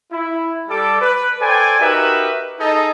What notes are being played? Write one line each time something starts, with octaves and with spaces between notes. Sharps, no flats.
E4
G3 A4 D6
B4
A4 C5 D5 G5 G#5
D#4 F#4 G4 A#4 B4 E5
D#4 G#4 A4 D#5